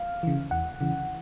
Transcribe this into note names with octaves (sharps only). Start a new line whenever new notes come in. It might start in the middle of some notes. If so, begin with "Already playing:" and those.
Already playing: F5
C#3 E3
E2 F#5
C#3 E3